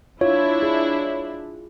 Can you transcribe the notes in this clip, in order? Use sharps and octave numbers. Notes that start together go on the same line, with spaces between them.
D4 E4 F4 C#5
G#4